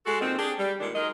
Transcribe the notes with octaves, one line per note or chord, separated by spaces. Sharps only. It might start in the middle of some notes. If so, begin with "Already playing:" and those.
G#3 F#4 A4
A#2 D#3 C4
D4 G4 G#4
G3
A#2 D3 D#3 G#3 D4
F#3 G#3 D#4 A#4 D#5